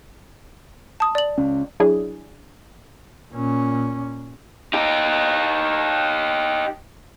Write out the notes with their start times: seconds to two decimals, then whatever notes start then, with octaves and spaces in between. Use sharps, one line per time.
1.00 A5 D#6
1.15 D5 F#7
1.38 C#2 C#4
1.80 F#3 D4 E4 G#4
3.33 A#2 C#4
4.74 D#4 G4